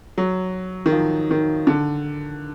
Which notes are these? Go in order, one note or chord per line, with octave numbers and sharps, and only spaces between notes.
F#3
D#3
F3
D#3
D3